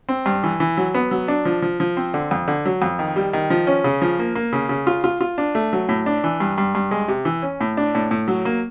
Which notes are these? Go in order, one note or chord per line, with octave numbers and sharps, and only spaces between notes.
C4
G2
E3
E3
F#3
B3
F#3
D4
F3
F3
F3
C4
D3
F2
D3
F#3
F2
D#3
G3
D#3
F3
C#4
C#3
F3
A#3
A#3
C#3
C#3
F4
F4
F4
D4
A3
F#3
A2
D4
E3
G2
G2
G2
G#3
C3
E3
C#4
A2
D4
A2
A2
F#3
A#3